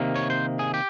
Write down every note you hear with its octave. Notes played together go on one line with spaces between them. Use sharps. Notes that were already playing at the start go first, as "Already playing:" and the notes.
Already playing: C3 D#3 A#3
C#5
C5
G#4
G4